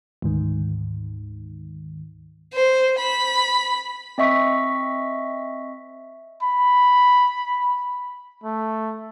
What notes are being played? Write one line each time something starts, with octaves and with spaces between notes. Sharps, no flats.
D2 G#2 D#3
C5
B5
C4 D#5 E5 C#6 B6
B5
A3